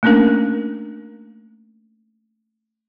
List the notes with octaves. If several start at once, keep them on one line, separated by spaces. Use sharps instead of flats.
A3 A#3 C#4 D4 A#4